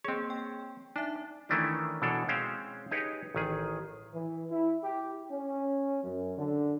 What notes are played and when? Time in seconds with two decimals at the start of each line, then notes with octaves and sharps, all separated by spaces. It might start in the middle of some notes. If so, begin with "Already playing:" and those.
0.04 A#3 C4 G#4 C#5
0.30 G5
0.96 D4 D#4 E5
1.49 D#3 E3 A3 C#4 D4 E4
2.02 B2 E3 D4 A4 C#5
2.28 G#3 C4 C#4 C5 F5 G5
2.91 D#4 G4 G#4 B4 C#5 D#5
3.35 A1 D#3 G#4
4.14 E3
4.51 E4
4.84 G4
5.32 C#4
6.04 F#2
6.38 D3